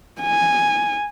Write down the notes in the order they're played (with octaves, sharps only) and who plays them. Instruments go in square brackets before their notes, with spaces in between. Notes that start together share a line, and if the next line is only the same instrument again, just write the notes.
[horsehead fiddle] G#5